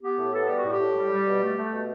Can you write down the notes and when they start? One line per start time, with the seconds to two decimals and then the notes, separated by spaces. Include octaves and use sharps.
0.02 B3 G4
0.17 A2
0.33 B3 A4
0.45 G3 G4
0.57 F#4
0.64 A2 G4
0.80 A2
0.95 G3
1.11 G3
1.27 B2
1.42 A3
1.58 A3
1.73 B2